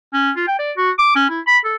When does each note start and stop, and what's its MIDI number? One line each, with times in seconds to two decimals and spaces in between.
0.13 0.30 61
0.36 0.45 65
0.47 0.55 79
0.59 0.72 74
0.77 0.90 66
0.99 1.13 86
1.15 1.27 61
1.30 1.40 64
1.47 1.58 83
1.65 1.76 69